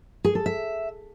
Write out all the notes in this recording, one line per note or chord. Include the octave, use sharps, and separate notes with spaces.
G#4
A4
E5